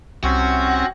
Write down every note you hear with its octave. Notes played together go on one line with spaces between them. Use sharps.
C2 C4 C#4 F#4